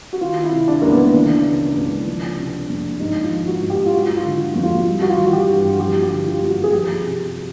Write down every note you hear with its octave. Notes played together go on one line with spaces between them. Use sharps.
F#4
D#3 F4
E4
C3
D4
C#2 A#3
B3
E3 D4
C#3
C#2
F3
C3
F2
G#2 D#4
F4
F3
F#4
G#2
G4
F4
F#3 F#4
F4
D3
F2
F4
G3
F#4
F4
E3
F#4
G4
G2
F3 G4
G4
D3
F4
F#2
F#4
G#4
F3 G4
C3